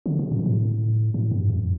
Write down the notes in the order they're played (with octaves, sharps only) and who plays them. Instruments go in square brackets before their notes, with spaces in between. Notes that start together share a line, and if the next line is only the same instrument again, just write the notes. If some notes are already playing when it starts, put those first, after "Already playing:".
[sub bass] D3
C3
A2
A#2
A2
A2
G2
F2